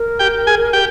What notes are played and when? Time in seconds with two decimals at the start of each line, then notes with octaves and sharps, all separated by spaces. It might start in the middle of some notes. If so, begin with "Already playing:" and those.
Already playing: A#4
0.19 G4 G5
0.47 G#4 G#5
0.73 G4 A#4 G5